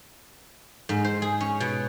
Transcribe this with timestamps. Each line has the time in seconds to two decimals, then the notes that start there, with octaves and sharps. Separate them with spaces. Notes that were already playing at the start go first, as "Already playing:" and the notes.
0.89 G#2
1.04 C5
1.22 G#4
1.41 C#4
1.60 B2